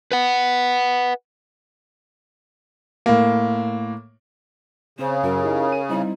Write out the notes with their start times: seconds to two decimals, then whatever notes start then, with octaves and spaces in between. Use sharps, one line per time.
0.12 B4 F#5
3.06 A2 A#3
4.99 C#3 C4 C5
5.23 F#2 F#3 A#4
5.41 D#4 E4 G4
5.72 D#7
5.89 G3 C4 D#4 E4